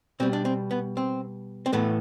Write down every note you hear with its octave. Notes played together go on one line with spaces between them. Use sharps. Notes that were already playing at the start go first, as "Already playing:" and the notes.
B2 G3 C4
D4
C4
B3
C4
C4
A2 E3 A3 B3